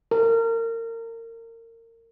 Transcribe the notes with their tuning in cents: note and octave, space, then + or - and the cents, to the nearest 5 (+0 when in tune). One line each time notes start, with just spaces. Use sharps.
A#4 -30